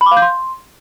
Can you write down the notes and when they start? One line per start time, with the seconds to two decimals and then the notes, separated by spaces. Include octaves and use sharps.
0.01 B5
0.06 D6
0.11 F5
0.17 G6
0.22 C6